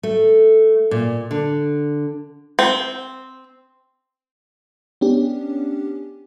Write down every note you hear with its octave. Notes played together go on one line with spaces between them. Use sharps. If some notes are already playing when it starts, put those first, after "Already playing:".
A3
A#2
D3
C4
B3 C#4 D4 G4